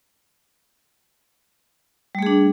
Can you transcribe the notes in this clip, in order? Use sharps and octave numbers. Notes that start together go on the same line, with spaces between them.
G3 A3 D4 G#4